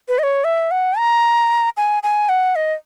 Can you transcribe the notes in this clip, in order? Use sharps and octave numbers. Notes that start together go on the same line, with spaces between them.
B4
D#5
C#5
E5
F#5
A#5
G#5
G#5
F#5
D#5